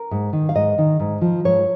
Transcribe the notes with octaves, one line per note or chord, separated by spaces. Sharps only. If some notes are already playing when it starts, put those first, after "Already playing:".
Already playing: A#4
G#2
D#3
F5
G#2 D#5
D#3
G#2
F3
G#2 C#5